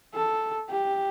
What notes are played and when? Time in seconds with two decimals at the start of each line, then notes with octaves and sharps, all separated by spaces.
0.14 A4
0.71 G4